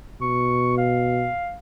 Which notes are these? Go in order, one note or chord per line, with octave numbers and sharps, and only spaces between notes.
B2 C#6
F5